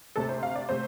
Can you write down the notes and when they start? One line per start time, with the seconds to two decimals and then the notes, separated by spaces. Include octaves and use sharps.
0.16 D2 C3 A3 C4 A4
0.29 C5
0.43 F5
0.55 D5
0.69 C3 A3 C4 C5